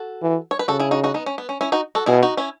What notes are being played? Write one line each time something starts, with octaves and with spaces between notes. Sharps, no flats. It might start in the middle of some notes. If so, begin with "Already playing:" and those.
Already playing: F#4 A4
E3
C#5
B4
C#3 F#4 A4
E4 G#4
D#4 F#4
D#4 F#4
B3 D#4
C#4
B3
C#4
C#4 E4
D#4 F#4
F#4 A4
B2 E4 G#4
D#4 F#4
C#4 E4